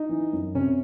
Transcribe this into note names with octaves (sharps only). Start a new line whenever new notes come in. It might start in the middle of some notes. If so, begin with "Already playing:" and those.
Already playing: D#4
E3
F#2
C3 C#4